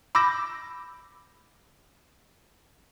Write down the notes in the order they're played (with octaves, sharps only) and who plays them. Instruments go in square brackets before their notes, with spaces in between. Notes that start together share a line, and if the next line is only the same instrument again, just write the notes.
[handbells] B5 D6 E6 G6 A#6